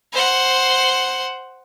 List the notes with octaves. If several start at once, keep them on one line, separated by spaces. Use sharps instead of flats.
C5 F#5